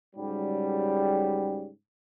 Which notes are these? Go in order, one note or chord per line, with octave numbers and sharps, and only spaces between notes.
G#2 C#3 F#3 G3